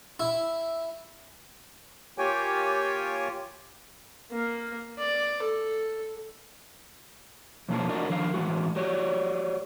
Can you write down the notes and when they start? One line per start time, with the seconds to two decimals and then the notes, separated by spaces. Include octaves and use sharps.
0.20 E4
2.18 A#3 F4 G4 C#5 G5 G#5
4.32 A#3
4.98 D5
5.42 A4
7.69 F2 B2 A#3 C#4 F4 A5
7.89 D4 E4 F#4 A#4 D5 D#5
8.09 D3 D#3 F3 A#4 F5
8.34 A2 E3 G#3 F#4
8.76 F#4 G4 C#5 D5